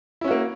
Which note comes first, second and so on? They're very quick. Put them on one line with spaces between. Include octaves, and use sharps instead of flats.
E4 C#4 F#4 A#3